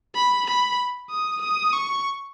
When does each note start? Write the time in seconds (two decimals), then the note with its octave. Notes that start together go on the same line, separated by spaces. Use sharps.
0.15 B5
0.47 B5
1.10 D#6
1.41 D#6
1.73 C#6